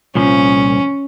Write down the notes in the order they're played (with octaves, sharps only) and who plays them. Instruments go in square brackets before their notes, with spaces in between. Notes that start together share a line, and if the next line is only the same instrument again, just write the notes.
[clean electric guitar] C2 A#2 F3 [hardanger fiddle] C#4